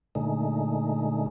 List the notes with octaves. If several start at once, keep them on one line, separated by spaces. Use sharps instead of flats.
A#2 D3 G#3 A3 D#4